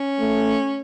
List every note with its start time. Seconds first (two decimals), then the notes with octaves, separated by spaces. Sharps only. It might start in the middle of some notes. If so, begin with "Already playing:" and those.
Already playing: C#4
0.20 A3